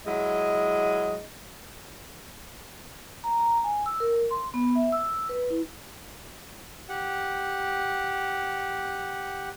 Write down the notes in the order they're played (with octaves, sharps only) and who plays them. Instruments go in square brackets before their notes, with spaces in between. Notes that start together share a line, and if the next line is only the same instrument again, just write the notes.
[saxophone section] F#3 G#3 E4 D#5
[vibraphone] A#5
A#5
G#5
E6
A#4
C6
B3
E5
E6
B4
E4
[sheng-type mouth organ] G4 F#5